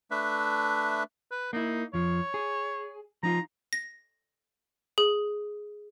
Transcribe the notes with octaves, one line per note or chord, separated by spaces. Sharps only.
A3 D4 B4 E5
B4
A#3 D#4 E4
F2 F3 C#5
G#4
F3 D#4 F4 A#5
A#6
G#4